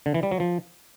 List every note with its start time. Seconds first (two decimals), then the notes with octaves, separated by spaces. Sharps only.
0.06 D3
0.14 E3
0.23 G3
0.31 F#3
0.40 F3